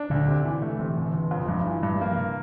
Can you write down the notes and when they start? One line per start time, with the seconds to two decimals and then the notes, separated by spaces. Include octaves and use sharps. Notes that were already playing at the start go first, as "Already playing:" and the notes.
Already playing: D4
0.10 D2 D3
0.27 C3
0.45 E3
0.62 A3
0.79 C3 E3
0.97 G1
1.14 G1
1.31 F2
1.48 G2 F3
1.67 E3
1.83 G2 G3
1.95 G3
2.01 F3 A#3
2.17 C3